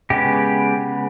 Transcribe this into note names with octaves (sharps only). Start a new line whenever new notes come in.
C#3 G#3 B3 G4